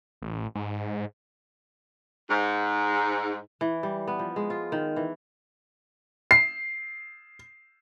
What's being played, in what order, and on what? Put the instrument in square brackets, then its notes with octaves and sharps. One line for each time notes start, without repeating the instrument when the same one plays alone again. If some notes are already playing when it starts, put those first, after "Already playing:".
[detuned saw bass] A1
G#2
[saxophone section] G#2
[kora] E3
G3
B3
F3
G#3
F4
D#3
E3
[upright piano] C7